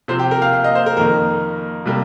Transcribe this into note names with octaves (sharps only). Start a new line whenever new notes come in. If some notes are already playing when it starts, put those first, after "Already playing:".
C3 F3 C4 C5
G4
A#4
F5
F5
D#5
C5
A#4
F2 D#3 A#3 A#4
C3 G3 A#3